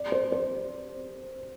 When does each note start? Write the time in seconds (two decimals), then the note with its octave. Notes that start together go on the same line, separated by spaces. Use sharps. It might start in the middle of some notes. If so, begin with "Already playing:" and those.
Already playing: D5
0.12 C5
0.32 C5